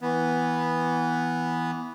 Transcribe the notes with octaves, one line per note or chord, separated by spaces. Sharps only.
E3 B3